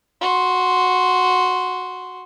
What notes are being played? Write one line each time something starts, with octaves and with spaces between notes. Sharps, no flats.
F#4 C6